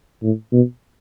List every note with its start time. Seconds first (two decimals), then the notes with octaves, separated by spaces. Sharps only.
0.23 A2
0.53 B2